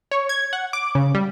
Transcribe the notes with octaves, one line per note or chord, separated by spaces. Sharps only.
C#5
G#6
F#5
D6
C#3
G3